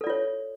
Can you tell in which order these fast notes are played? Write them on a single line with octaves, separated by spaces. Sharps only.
A4 D5 F4 C#5